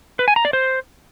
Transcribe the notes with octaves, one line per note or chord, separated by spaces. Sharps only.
B4
G#5
A#5
D5
C5